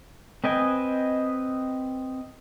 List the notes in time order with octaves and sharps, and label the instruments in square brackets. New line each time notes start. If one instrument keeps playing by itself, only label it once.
[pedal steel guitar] C4 B4 D#5 G5 G#5